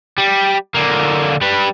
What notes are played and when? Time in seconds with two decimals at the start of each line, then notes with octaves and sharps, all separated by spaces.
0.18 G3
0.75 D3 A#3
1.41 G3 B4